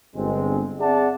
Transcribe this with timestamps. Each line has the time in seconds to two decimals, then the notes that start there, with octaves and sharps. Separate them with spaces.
0.16 G1 G#3 C4
0.80 C4 G#4 D5 E5 F#5 A5